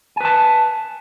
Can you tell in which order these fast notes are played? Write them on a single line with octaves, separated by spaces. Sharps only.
G#5 B4 A5